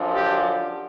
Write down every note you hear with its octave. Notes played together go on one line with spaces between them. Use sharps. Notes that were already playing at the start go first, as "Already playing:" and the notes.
Already playing: F#2 D3 F3
G4